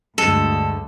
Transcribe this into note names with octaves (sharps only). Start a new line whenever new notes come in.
D2 G2 D3 G#3 A4